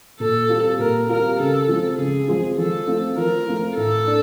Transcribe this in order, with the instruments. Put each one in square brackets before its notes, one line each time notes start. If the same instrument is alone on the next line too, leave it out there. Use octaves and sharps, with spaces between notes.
[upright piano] A#2 [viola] A4
[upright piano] G3 C4 F4
[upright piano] A#2 [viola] A#4
[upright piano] G3 C4 F4 [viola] A#4
[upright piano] C#3 [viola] A4
[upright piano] F3 G#3 C4
[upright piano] C#3 [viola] G#4
[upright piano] F3 G#3 C4
[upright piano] F3 [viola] A4
[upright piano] A3 C4 F4
[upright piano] F3 [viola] A#4
[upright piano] A3 C4 F4
[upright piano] A2 [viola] A4
[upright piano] D4